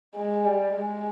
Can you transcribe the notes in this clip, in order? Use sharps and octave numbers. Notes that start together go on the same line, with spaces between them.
G#3
G3
G#3